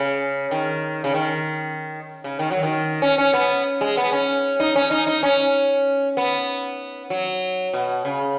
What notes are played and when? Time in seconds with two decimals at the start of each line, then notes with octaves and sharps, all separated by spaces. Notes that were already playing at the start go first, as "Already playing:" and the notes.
Already playing: C#3
0.51 D#3
1.04 C#3
1.14 D#3
2.24 C#3
2.39 D#3
2.51 F#3
2.63 D#3
3.02 C#4
3.18 C#4
3.33 B3
3.81 G#3
3.97 B3
4.12 C#4
4.60 D#4
4.76 C#4
4.91 D#4
5.07 D#4
5.23 C#4
6.17 B3
7.10 F#3
7.73 B2
8.05 C#3